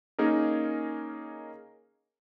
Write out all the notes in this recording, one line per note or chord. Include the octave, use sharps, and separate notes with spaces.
A#3 C#4 D#4 G#4 A#4